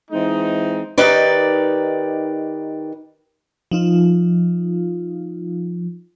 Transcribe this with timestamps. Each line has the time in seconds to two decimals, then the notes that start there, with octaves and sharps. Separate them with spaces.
0.11 E3 G#3 C4 D#4
0.98 D#3 D#4 G4 B4 D5
3.71 F3 D#4 F4